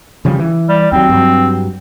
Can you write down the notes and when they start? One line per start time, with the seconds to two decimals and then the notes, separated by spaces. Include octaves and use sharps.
0.25 C#3 F3 G3
0.39 E3
0.69 G3
0.92 D#2 F#3 C4
1.09 G2 F#3